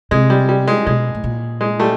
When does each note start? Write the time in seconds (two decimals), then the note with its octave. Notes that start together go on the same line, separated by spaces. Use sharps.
0.11 C3 G#3
0.30 G3
0.49 G3
0.67 G#3
0.86 B2 G#3
1.15 A2
1.24 A#2
1.61 G#3
1.80 G3 A3